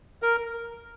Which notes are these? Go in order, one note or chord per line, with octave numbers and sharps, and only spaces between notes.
A#4